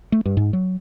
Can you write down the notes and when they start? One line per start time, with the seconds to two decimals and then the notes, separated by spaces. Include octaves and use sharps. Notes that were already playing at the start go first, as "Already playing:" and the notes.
0.12 A3
0.25 G2
0.37 G#2
0.53 F#3